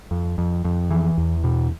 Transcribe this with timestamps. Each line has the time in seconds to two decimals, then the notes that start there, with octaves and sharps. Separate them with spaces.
0.11 F2
0.38 F2
0.65 F2
0.90 E3
1.18 E2
1.44 B2